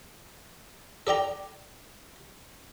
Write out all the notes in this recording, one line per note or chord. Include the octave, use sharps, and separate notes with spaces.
A4 D5 G5 A#5